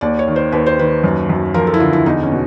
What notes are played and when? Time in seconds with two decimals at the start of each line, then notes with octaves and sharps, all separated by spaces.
0.01 D#2 D5
0.19 C#5
0.28 D#3
0.36 C5
0.52 D#2 B4
0.66 C5
0.79 D#3 B4
1.04 F#2
1.29 F#2
1.54 F3 A#4
1.67 A4
1.74 E4
1.80 D3 F4
1.93 E4
2.06 E2 D#4
2.23 C#4
2.32 B2